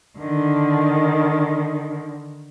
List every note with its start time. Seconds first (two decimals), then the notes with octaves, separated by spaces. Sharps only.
0.19 D3 D#3